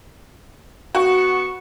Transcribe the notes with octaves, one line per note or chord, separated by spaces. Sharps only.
B3 F#4 C#6